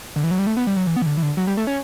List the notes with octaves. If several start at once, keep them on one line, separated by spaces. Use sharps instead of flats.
D3
E3
F#3
G3
A3
B3
G3
F#3
E3
B3
E3
D3
E3
D3
F#3
G3
A3
C#4